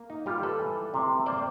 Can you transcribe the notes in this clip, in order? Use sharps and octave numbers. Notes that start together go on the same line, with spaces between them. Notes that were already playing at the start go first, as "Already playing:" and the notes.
Already playing: A#3
D#4
G3 F4 G4
A4 B4
E3
C3
A#3 C5 D5